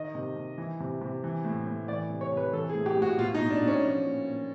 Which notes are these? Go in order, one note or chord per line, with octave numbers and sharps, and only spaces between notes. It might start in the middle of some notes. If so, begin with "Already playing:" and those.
Already playing: D#3 D#5
C3
C3
E3
C3
C3
E3
A2
A2
E3 D5
C3
C#5
C3
B4
E3 A4
G#4
A2
G4
A2
F#4
B2 F4
D#4
B2
D4
B2
C#4
F3
A#2
A#2